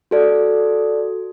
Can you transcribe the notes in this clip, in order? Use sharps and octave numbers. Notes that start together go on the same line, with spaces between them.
F#4 A4 D5